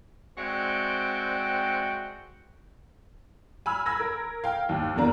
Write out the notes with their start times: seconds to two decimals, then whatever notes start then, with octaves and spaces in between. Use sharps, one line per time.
0.38 G#3 C4 F#4 D5 E5 G5
3.66 G#5 B5 E6 F6
3.86 B5 E6 G#6 A#6
4.00 A#4
4.44 F5 G5
4.69 D#2
4.96 E2 C#3 A#3 D4 A#5